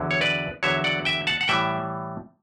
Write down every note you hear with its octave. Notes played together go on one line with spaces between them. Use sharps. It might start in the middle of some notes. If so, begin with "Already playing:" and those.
Already playing: E2 D3 F#3
C#5
B4 D5
E2 D3 F#3 C#5 E5
D5 F#5
E5 G5
F#5 A5
F#5
A2 E3 G3 E5 G5